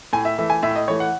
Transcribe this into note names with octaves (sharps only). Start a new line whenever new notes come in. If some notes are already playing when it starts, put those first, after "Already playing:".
A2 G#5
E5
E3 A3 E5
G#5
A2 E5
D#5
E3 A3 C#5
F#5